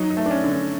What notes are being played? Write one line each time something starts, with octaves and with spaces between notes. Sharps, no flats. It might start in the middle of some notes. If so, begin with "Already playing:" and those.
Already playing: F#3 D#4
D#4
A3
D4
C#4
D3
C#4